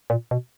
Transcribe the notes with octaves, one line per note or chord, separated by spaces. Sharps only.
A#2
B2